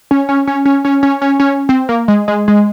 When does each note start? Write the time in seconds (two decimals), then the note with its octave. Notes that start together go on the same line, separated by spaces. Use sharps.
0.11 C#4
0.29 C#4
0.47 C#4
0.65 C#4
0.85 C#4
1.03 C#4
1.22 C#4
1.40 C#4
1.69 C4
1.89 A#3
2.08 G#3
2.28 G#3
2.48 G#3